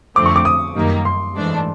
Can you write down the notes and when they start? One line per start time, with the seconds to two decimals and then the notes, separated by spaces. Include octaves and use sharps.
0.15 F2 D3 F3 A3 C4 D6
0.26 C#6
0.36 D6
0.45 D#6
0.75 F#2 D#3 G3 A#3 D#4
1.05 C6
1.35 G#2 E3 A3 D4